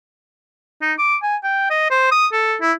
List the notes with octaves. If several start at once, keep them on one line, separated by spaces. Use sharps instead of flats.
D#4
D6
G#5
G5
D#5
C5
D#6
A4
E4